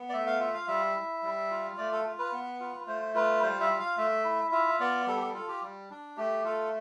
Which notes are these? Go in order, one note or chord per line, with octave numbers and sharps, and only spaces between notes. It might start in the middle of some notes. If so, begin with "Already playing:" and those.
Already playing: B3
D5
A3 E5
F5
F4 E5
F5
G3 E5
E4
G3
F4
A3 D5
A4
F4
B4
B3
F4
A3 C5
F4 B4
G3 C5
E5
F4
F5
A3 E5
E4
F4 E5
B3 D5
G3 A4
G4
A4
F4 A4
G4
G3
D4
A3 G4
F4 A4